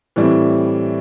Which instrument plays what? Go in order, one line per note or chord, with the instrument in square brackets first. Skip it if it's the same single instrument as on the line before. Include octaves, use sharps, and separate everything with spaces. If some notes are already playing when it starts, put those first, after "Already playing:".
[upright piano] A2 E3 G3 C4 E4